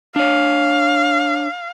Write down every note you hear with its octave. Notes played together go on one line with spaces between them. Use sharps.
D4 C#5 F5